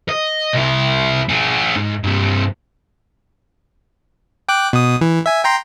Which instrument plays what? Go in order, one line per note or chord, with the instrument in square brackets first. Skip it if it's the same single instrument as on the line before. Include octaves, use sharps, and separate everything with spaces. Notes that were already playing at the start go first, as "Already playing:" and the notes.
[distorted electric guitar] D#5
C2 E4
D4 G#4
G#2
G2 C3
[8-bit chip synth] G5 D6 F#6
B2 D#6
E3
E5 G#5
G5 A#5 C6